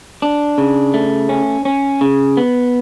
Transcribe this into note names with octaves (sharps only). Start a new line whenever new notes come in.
D4
C#3
A3
C#4
C#4
C#3
B3